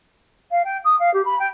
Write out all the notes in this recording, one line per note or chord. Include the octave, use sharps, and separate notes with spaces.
F5
G5
D#6
F5
G4
B5
G5